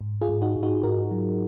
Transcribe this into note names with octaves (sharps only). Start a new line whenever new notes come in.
G#2
F4 G#4
G#2
D#4 F#4
G#2
D#4 F#4
G#2 F#4 A#4
F#3